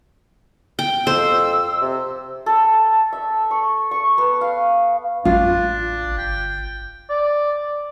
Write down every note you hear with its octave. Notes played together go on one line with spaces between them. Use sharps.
G5
F2 C5 E6
C3
A4
E5
C#6
C#6
B3
F5
A1 D4 F4
G1 G5
D5